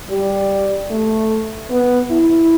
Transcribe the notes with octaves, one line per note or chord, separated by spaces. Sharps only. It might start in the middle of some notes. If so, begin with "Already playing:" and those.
G3
A3
B3
E4